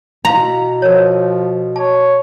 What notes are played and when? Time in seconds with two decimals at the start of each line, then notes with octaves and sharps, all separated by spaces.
0.25 B2 E4 F5 A#5 C6
0.82 F3 A#4 C#5
1.76 C#5 A5